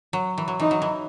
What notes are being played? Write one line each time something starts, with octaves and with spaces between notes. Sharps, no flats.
F#3
E3
F#3
E3 D#4
F#3
E3